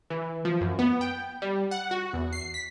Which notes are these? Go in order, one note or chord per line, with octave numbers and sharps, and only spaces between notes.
E3
F3
F#2
B3
G5
G3
F#5
F#4
E2
C7
B6